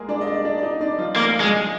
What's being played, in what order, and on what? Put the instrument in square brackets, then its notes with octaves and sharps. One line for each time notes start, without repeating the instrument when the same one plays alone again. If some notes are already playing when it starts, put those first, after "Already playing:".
Already playing: [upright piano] G#3 A#3 G#4 A#4
D4 D5
D#5
D4 D5
D4 D5
D5
D#4 D#5
D4 D5
F3 F4
[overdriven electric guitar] A#3
G#3